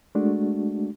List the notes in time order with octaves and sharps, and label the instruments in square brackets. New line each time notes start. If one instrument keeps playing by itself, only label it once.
[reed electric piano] G#3 A3 D4 F#4